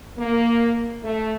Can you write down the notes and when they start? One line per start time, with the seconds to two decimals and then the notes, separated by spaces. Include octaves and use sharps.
0.18 A#3
1.04 A3